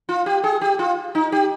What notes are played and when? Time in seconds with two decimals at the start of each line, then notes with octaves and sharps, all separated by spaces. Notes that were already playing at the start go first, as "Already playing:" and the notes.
0.09 F4
0.26 G4
0.44 G#4
0.61 G4
0.79 F4
1.15 D#4
1.32 G4